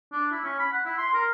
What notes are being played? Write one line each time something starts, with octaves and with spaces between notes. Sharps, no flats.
D4
E4
C#4
B5
F#5
E4
C6
A#4